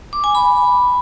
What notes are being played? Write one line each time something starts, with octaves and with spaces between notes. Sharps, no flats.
D6
G#5
B5